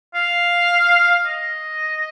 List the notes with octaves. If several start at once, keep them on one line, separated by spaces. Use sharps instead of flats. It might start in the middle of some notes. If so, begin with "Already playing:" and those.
F5
D#5